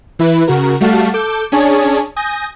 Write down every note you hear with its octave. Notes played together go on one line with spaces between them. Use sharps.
E3 E4 B4
C#3 F#4 A#4
G3 A3 F#4 F5 A5
A4 D6 G6
C#4 D4 G#4 C#5 G#5 A5
G#5 D#6 G6 A#6